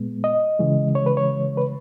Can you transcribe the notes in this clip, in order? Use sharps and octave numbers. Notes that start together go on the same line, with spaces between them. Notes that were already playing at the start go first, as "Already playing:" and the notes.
Already playing: A#2 G#3 B3
D#5
C#3 E3 G#3
C#5
B4
C#5
B4